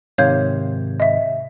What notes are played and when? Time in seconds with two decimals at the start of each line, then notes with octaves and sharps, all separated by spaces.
0.18 G#2 C3 D#3 C#5 F5 G6
1.00 D#5 E5